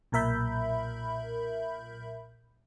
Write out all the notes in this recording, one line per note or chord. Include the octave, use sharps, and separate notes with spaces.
B1 A#2 A#4 E5 B5 G6